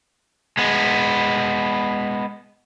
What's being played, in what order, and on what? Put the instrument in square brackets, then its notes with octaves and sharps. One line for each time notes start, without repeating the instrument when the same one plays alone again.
[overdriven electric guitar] G#3 B3